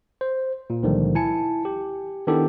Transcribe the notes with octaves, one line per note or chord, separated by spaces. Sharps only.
C5
A#2
C#2 A#2 D3 D#3 F3 G3
E4 G#5 A5 C#7
G4
D#3 B3 D4 E4 G4 A4